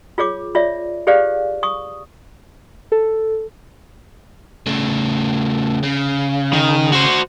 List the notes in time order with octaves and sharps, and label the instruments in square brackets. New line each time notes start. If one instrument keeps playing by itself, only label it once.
[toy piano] F4 G#4 C#5 D6
F4 C#5 D5 E5
G4 G#4 B4 C5 D5 F5
C#6 D#6
[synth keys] A4
[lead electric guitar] C#3 A3
C#3
[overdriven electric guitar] D#3
F#4 C5